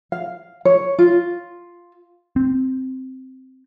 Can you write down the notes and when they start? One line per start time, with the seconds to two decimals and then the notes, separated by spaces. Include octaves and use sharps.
0.12 F5
0.65 C#5
0.99 F4
2.36 C4